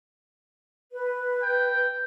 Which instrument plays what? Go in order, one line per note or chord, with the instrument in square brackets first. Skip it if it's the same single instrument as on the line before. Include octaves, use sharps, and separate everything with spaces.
[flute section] B4
[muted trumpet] G5